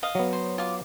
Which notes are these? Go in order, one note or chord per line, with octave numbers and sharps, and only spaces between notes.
D#5 F5
F#3 B3
C5
F4 D6